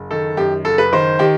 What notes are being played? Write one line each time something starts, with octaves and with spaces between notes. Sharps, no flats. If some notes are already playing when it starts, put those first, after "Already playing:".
Already playing: F#1
D#3 A4
F#2 G4
F#1 A4
B4
D#3 C5
D#3 G4